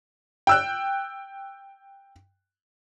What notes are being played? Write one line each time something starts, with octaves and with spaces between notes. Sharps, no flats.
G5 E6 F#6